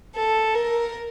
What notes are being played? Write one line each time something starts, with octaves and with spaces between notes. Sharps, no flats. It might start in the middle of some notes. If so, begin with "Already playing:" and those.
A4
A#4